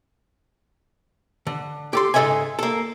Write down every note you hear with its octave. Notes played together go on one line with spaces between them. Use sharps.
D3
G4 A4 C6
G#2 C#3 A4 D#5 E5 G#5
A#3 A4